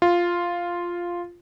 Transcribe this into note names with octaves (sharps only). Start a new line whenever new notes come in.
F4